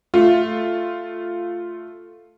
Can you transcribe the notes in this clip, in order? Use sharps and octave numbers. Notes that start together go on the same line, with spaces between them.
A3 F4